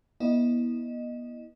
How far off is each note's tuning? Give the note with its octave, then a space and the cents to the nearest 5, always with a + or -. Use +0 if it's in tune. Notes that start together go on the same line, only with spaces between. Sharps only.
B3 -35 E4 -25 D#5 -15